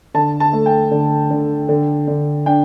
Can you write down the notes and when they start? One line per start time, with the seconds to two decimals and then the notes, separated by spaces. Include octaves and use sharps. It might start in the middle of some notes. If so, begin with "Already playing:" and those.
0.14 D3 A5
0.40 A5
0.53 A3
0.66 G5
0.91 D3
1.31 D3
1.69 D3
2.08 D3
2.46 D4 G5